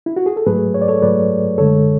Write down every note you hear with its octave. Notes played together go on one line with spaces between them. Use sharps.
E4
F#4
G#4
A4
G#2 F#3 A3 G#4 B4
C#5
D5
A4 C#5
G#2 F#3 A3 B4 D5
F#2 D3 G#3 A4 C#5